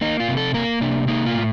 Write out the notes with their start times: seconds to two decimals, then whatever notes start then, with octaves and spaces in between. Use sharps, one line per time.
0.01 A#3 D#4
0.20 F4
0.28 C3
0.37 A4
0.54 A#3 A#4
0.81 C3 D4
1.08 A#3 D#4
1.26 F4
1.35 A2